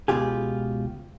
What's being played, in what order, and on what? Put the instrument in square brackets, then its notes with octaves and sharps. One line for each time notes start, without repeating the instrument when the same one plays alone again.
[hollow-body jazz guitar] C#2 F#2 B2 F4 G4 G#4